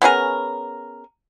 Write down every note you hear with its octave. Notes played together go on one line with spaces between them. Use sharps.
B3 C#4 G#4 A#4